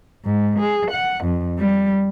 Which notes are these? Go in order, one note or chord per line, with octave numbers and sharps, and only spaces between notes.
G#2
G#4
F#5
F2
G3